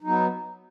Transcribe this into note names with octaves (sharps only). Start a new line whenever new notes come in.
F#3 B3 D#4